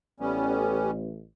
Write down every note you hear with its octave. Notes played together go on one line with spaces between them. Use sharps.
A1 G3 B3 C#4